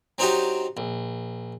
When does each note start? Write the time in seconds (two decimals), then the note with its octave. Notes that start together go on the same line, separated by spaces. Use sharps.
0.18 F#3 C4 D4 D#4 F#4 G4
0.77 A#1